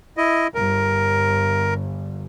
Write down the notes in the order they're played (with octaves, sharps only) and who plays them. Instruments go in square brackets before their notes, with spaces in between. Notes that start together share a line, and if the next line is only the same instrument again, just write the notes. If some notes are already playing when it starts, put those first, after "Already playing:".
[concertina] E4 D#5
[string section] G1 [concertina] A#4